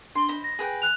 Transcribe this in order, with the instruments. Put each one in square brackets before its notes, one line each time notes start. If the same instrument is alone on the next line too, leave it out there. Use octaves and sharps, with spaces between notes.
[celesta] D4 G7 [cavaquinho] C6
[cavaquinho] C5 D#5 B5
[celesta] A#6
[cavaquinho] G#4 B4 G5
[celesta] F#6 F7